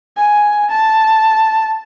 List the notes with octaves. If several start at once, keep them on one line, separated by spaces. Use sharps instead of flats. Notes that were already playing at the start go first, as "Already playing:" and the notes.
G#5
A5